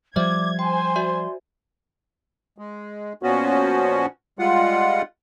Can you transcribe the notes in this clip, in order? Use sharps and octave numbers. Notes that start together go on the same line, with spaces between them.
F3 G3 C5 D5 E5 D6 G#6
C5 G5 G#5 C6
F#4 D5 E5
G#3
A#2 F3 B3 C#4 F#4
G3 G#3 F4 F#5